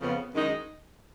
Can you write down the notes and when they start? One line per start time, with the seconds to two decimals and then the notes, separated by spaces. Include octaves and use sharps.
0.01 F2 C#3 F3 B3
0.34 F#2 D#3 G#3 D#4